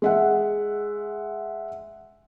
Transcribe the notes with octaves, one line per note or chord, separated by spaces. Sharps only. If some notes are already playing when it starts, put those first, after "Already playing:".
G#3 E5 F#5